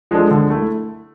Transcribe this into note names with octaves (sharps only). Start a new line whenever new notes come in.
F3 G#3 D4 A4
D3
A3 E4